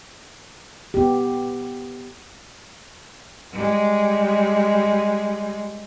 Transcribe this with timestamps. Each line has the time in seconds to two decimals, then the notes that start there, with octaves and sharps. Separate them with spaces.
0.94 B3 G4
3.52 G3 G#3